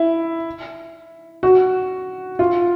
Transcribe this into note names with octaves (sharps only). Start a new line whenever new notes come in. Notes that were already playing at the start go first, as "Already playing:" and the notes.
Already playing: E4
F#4
F4